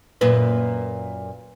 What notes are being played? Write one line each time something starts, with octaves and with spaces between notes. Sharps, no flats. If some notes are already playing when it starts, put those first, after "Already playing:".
F#2 A#2 B4